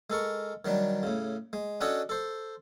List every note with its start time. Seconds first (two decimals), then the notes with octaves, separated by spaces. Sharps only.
0.10 G#3 A4 A#4 C#6
0.65 D#3 F#3 G3 D4
1.03 A2 C#3
1.53 G#3
1.81 C#4 D4 F#4 A4 C#5 D#5
2.09 A4 C5